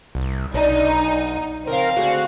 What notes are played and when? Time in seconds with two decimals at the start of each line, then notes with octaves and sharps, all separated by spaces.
0.15 C2
0.54 B1 D4 D#4
1.67 C#3 F3 C4 A#4 F5
1.97 D3 A3 F#4 G#4